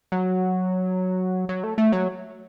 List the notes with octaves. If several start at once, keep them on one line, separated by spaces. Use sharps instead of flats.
F#3
F#3
A3
A3
F#3